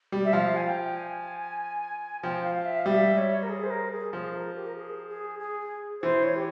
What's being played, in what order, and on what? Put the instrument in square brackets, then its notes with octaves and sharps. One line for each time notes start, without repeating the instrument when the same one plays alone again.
[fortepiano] G3
[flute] E5
[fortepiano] F3 [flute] F5
[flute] G#5
G5
G#5
[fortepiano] F3 [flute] G5
[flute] F5
F5
E5
F5
[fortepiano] G3 [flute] E5
[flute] C#5
A#4
G#4
C5
A#4
G#4
[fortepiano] F3 [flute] G#4
[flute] A#4
G4
A#4
G#4
G#4
G#4
[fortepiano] E3 [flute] C5
[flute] C#5
G4